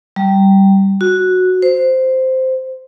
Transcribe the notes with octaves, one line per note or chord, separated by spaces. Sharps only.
G3
F#4
C5